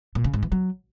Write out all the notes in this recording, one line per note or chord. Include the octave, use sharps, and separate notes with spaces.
A#2
C#3
G#2
E3
F#3